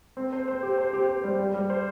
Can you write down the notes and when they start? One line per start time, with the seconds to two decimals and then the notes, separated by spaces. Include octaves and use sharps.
0.17 C4
0.32 C5
0.48 C5
0.63 G4
0.78 C5
0.93 G4
1.09 C5
1.24 G3
1.39 G3
1.54 G3
1.70 C5